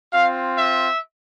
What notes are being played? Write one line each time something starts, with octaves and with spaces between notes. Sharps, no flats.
C4 F4 F5
E5